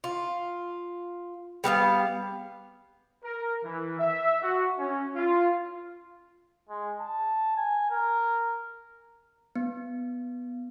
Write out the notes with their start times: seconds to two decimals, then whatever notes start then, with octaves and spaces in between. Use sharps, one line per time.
0.04 F4
1.64 G3 B3 C#5 F5
3.24 A#4
3.64 E3
3.99 E5
4.42 F#4
4.79 C#4
5.15 F4
6.69 G#3
7.00 A5
7.57 G#5
7.90 A#4
9.56 B3